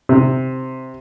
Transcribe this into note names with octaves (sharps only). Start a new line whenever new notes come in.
C3